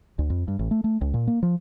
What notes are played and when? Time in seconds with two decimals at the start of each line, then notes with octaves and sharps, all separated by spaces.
0.19 D2
0.30 F2
0.48 G2
0.59 A1
0.71 A3
0.84 A3
1.01 C#2
1.14 A#2
1.27 A#3
1.43 F3